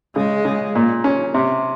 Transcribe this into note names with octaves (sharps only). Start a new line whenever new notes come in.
C#3 G#3
C#3
A#2
C#4
C3